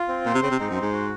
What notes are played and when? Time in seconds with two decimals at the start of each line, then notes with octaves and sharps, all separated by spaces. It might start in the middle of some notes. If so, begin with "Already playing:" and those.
Already playing: F4
0.08 C4
0.25 A#2 C5
0.34 C3
0.42 C#3 C4
0.51 C3
0.59 G#2 D#4
0.71 F#2
0.76 C5
0.81 G#2
0.93 F#4